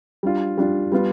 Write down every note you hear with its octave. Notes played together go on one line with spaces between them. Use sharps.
G3 D4 F4
G3 D4 F4
G3 B3 F4